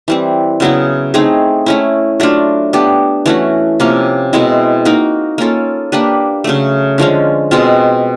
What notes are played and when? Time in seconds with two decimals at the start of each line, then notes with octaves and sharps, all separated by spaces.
0.08 E3 G3 C4
0.60 C#3 F#3 B3 E4
1.14 A3 C4 D#4 G#4
1.66 A3 C#4 E4
2.20 F#3 A3 D4 F4
2.73 B3 D4 G4
3.26 E3 A3 C#4 F#4
3.80 C3 F3 A#3 C#4
4.33 B2 G#3 C4 E4
4.85 A#3 D#4 F#4 A#4
5.38 A#3 C#4 F4 A4
5.92 A#3 D4 G4 B4
6.44 C#3 F#3 A3
6.98 D3 F3 G#3 C#4
7.51 B2 G#3 C4 F4